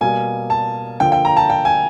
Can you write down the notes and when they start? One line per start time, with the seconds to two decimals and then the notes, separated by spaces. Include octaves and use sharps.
0.01 B2 G3 A#3 G#5
0.50 A5
1.00 D3 F3 A#3 G5
1.12 G5
1.25 A#5
1.37 A5
1.50 G5
1.65 G#5